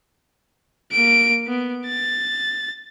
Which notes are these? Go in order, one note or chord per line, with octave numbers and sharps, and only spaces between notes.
A#3 D7
B3
A6